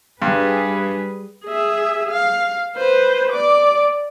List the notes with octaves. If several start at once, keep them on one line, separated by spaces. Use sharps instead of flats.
G2 G3 G#4 B4
G#4 E5
F5
B4 C5
D5 D6